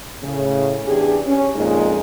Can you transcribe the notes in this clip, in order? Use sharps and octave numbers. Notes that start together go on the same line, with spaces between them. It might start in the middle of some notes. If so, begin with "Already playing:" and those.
A2 C#3
E2 D4 G4 G#4
C#4
F2 A#2 G#3 D#4